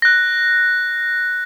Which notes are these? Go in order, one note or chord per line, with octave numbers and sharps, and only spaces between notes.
F#6 A#6